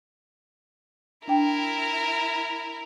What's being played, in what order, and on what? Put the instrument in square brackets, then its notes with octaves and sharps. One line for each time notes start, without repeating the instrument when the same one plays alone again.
[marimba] D4 G5 [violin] E4 A#4